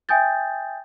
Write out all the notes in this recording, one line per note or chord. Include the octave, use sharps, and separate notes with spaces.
E5 G5 G#5 D#6 G6 A6